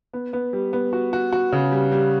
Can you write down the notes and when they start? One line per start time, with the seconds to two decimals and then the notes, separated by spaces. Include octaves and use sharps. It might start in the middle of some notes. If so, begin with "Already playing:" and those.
0.13 B3
0.33 B3
0.53 G3
0.73 B3
0.93 F#4
1.13 F#4
1.32 F#4
1.53 C#3
1.72 G3
1.92 G3